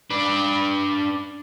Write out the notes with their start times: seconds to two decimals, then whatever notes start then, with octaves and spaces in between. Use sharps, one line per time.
0.10 D4 B4